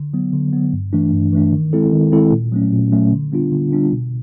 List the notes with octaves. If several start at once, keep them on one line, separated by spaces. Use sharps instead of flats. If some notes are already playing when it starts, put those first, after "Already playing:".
Already playing: D3
F#3 B3
D3
F#3 B3
G2
E3 A3 D4
G2
E3 A3 D4
D#3
G#3 C4 E4 A4
D#3
G#3 C4 E4 A4
A#2
F#3 A3 C#4
A#2
F#3 A3 C#4
D3
G3 B3 D4 F4
D3
G3 B3 D4 F4
B2